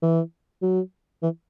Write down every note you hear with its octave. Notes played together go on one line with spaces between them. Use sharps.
E3
F#3
E3